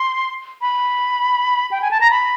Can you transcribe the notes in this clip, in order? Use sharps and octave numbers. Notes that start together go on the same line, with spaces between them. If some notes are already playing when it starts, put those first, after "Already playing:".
Already playing: C6
B5
G5
G#5
A5
A#5
B5